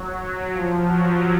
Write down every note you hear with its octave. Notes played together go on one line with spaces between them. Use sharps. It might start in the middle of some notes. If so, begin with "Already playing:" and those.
Already playing: F#3
F3
F#3